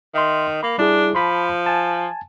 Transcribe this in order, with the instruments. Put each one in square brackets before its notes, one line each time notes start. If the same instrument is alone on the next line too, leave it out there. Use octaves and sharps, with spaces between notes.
[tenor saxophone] D#3 [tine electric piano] E5 C6
[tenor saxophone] A#3 [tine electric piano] B5
[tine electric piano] G3 E4 G#4 [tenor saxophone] D4
[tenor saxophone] F3 [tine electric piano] A5 B5 C6
[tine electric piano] G#5 A5